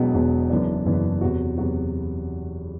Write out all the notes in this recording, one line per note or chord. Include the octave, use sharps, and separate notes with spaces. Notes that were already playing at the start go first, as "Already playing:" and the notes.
Already playing: E1 E2 B2 F#3 B3
E1 E2 B2 F#3 B3
F#1 F#2 E3 B3 D4
F#1 F#2 E3 B3 D4
E2 C3 F#3 B3 F#4
E2 C3 F#3 B3 F#4